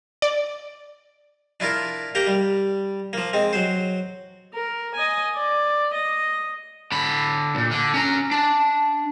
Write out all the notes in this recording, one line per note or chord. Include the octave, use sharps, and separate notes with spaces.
D5
D4 E4 F4 A#4
A#3 G4 G5 A#5
G3
F3 A#3
G#3 C4
F#3 C5
A#4
D#5 G#5
D5
D#5
D3 B5
D2 A#2
D3
C#4 A#5
D4